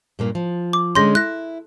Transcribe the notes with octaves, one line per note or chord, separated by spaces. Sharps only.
G2 A#2 A#3
F3
D6
D3 G#3 C#4 C6 G6 A#6
E4 F#6 A#6